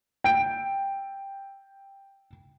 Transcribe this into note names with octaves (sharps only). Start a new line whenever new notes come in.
G5 D7